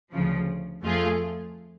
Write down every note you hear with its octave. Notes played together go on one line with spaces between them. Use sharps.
D2 C#3 F3
F2 F3 A3 F4 G#4